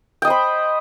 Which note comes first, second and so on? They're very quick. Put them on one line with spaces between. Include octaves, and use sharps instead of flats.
G5 D#5 C5 B5